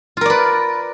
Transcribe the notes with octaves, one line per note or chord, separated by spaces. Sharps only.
F4 A#4 B4 D5